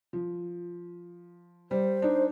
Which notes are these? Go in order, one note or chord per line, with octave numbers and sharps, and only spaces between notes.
F3
G3 C5
D4 D#4